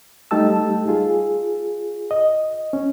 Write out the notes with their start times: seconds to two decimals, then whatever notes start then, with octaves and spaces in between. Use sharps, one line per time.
0.31 G3 A3 D#4 G4 A5 E6
0.88 F4 G#4
2.11 D#5
2.73 C#4